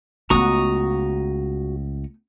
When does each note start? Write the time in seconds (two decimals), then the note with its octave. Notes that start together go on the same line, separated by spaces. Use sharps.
0.30 C#2 A3 B3 F#4 A#5 C#6 D#6